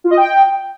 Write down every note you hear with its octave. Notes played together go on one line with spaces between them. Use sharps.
F4
D#5
G5